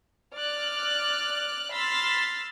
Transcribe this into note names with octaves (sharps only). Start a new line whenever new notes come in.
D5 F6 F#6
B5 C6 E6 F6 A6 B6